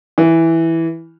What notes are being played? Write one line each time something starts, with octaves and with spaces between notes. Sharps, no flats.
E3